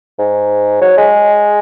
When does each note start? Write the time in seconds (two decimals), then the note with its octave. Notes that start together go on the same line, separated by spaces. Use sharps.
0.19 G#2
0.81 F#3
0.98 G#3